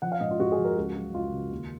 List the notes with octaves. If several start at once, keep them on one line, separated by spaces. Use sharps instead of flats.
F3 F#5
F5
G#2 D#5
F4
G#2 F#4
G#4
F3
A#4
C#2 F#4
F#3
C#2 F4
C#3
D#2